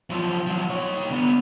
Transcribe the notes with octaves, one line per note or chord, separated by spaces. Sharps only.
F#2 F3
F3 F#3
D#3 C#5
D3 B3